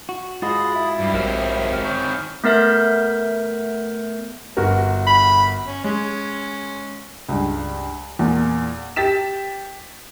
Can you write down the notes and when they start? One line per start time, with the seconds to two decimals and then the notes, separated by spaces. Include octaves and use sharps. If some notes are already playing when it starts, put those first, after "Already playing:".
0.09 F#4
0.42 G#2 G#3 F4 F#4 B5 D#6 A6
0.74 E4
1.00 G2
1.14 A#1 D#2 D#3 C4 E5 F6
1.84 C#4 C#6 F6 G6
2.44 A3 B3 A#4 E5 G6
4.57 G1 F#4 A#4
5.07 B5
5.66 C#4
5.84 G#3 C#4
7.29 C#2 G2
8.19 E2 A#2
8.96 G4 A6 B6 E7